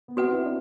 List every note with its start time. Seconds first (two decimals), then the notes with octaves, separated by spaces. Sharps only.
0.08 B3
0.16 C4 F#4 B4 F#5
0.31 E4
0.45 D4